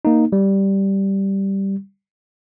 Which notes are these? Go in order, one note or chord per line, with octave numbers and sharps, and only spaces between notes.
A#3 D#4
G3